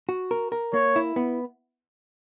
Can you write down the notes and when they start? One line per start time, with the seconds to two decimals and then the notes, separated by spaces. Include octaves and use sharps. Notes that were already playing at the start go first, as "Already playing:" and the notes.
0.09 F#4
0.31 A#4
0.52 A#4
0.74 A#3 C#5
0.96 E4
1.16 B3